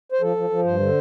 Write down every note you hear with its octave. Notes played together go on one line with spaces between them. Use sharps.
C5
F3 A4
F3
F3
G2 C5
D3